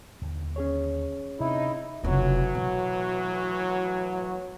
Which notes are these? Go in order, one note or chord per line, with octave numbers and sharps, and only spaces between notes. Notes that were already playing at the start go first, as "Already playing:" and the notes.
D#2 D3 D#3
C#4 G#4 C#5
C3 C4 D#4 E4
F1 A2 C#3 E3 F#3
B2